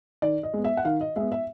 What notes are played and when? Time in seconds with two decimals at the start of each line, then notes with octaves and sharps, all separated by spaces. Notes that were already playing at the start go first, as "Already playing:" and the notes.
0.22 D#3 D5
0.43 D#5
0.54 G#3 B3
0.64 E5
0.77 F#5
0.85 D#3 F5
1.01 D#5
1.16 G#3 B3 E5
1.32 E5